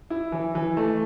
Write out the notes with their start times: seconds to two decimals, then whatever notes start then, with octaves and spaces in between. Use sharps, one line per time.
0.10 E4
0.32 E3
0.55 E3
0.77 A3